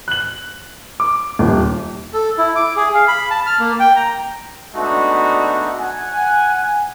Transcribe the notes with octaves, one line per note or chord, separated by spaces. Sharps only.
F#6 F#7
D6
D#1
A4
E4
D6
G#4
F5
B5
A5
F6
A#3
G5
A#5
G#3 A3 B3 D4 D#4 F#4
F#5 G#5